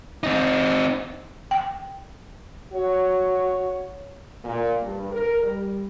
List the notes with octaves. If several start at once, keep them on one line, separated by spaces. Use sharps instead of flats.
C4 D#4
G5
F#4 C#5
A#2
G2
A#4
G3